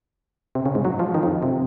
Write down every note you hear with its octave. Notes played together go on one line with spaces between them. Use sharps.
C3
C#3
G#2
F#3
F3
D#3
F2
C3